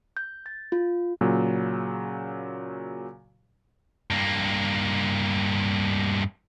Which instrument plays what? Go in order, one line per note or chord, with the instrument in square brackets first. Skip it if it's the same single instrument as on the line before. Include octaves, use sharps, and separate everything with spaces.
[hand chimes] G6
A6
F4
[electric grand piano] A#2 C#3 F#3
[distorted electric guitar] G2 A#3